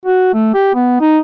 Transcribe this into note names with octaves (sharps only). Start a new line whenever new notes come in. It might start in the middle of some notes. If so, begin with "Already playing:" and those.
F#4
A3
G4
B3
D#4